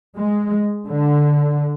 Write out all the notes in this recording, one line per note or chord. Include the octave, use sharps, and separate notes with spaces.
G#3
D3